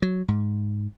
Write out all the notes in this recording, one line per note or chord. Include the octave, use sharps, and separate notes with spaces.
F#3
G#2